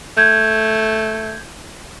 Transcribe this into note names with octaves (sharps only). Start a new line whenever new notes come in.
A3 G6 G#6